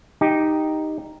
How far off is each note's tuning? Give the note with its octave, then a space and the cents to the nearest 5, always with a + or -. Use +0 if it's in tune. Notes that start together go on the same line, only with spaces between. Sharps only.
D#4 +0 G4 +0